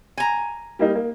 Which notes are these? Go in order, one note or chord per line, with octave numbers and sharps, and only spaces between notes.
G#5 A#5
G3 A#3 D#4
A#3